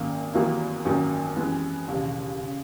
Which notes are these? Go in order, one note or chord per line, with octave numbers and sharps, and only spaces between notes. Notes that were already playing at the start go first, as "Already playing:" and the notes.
Already playing: G#1 F#2 D#3 A#3
E2 D#3 F#3 A#3 E4
G#1 F#2 D#3 F#3 A#3
F#2 E3 G#3 B3
E1 D#2 C#3
C#3